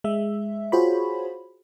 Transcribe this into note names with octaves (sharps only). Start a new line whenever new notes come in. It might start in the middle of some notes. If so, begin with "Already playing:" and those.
G#3 E5
F4 F#4 G#4 C5 C#5 B5